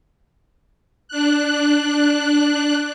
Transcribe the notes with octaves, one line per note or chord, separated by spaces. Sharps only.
D4 F#6